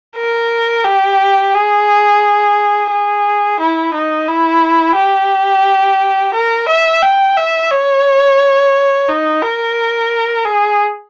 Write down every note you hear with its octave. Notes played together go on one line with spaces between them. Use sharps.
A#4
G4
G#4
G#4
E4
D#4
E4
G4
A#4
E5
G5
E5
C#5
D#4
A#4
G#4